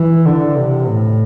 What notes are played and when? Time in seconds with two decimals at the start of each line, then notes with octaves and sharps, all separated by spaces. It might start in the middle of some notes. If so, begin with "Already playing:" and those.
Already playing: E3
0.26 D3
0.57 C3
0.88 A2